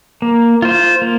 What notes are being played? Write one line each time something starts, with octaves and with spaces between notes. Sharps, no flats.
A#3
F4 C5
A#3